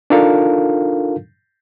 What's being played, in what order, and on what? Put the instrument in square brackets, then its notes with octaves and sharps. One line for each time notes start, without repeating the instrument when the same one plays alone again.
[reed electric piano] D4 D#4 F4 A4 A#4 F5